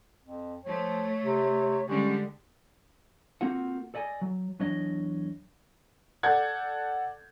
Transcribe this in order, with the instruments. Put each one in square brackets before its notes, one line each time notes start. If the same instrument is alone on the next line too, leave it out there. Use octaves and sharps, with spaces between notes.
[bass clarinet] F2
[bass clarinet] F3 [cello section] A3 [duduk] C#5
[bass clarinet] C3
[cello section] D3 G3 G#3 [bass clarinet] C#4 [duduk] G4
[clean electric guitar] A#3 C4 F4 F#4 A4 F#5
A4 D5 D#5 G#5
F#3
E2 F#3 D4 C#5 D#5
[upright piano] A4 D5 F#5 G6 G#6